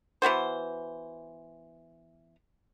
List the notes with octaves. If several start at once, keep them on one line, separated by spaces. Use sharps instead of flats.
E3 B3 F#4 C5